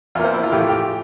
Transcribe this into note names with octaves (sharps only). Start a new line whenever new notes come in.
E2 E3 A#3 F4
C5
E4
F4
A2 E3 A3 G4
F4
G4